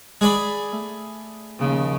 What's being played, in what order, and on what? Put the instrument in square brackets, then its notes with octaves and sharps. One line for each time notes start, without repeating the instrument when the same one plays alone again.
[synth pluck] G#3 [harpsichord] G#4 D5 B5
[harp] A3
[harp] D#2 A#2 F3 [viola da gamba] C#3